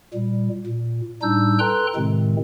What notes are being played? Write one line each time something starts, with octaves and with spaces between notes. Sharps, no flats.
A#2 G3
A#2
A2 G3 D4 D#4 E6 G6
A4 B4 G5 A#5 C6 F#6
A2 C3 D#3 G#3 C4